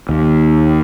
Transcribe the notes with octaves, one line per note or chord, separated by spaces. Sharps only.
D#2